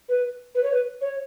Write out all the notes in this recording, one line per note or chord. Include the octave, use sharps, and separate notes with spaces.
B4
B4
C#5
B4
C#5